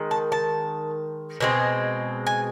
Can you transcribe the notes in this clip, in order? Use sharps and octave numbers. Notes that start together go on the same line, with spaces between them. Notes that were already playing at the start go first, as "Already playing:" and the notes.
Already playing: D#3 G#3
A5
A5
B2 G#3 C4
G#5